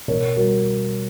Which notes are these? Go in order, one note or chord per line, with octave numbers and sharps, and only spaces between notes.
B2 A#4 C#5
G3 F#4 A#4